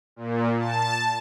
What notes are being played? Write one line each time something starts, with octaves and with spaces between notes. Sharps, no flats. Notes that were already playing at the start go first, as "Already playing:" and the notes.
A#2
A5